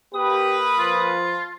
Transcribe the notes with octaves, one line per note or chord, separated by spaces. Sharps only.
A#3 G4 B4 D#6
F3 F4